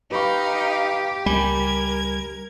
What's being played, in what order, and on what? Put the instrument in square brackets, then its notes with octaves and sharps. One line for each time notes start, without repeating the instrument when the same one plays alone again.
[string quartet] D#4 F5 [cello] G4 [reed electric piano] B4 B5 C#6
[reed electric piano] C#2 G#5 B5 [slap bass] G3 [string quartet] A#4 G#6